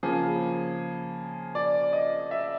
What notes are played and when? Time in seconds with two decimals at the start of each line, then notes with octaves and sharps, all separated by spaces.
0.03 C#3 F3 A#3 G#4
1.55 D5
1.93 D#5
2.31 E5